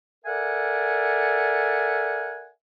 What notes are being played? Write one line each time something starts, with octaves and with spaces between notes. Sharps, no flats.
A4 A#4 D5 E5 F#5 G#5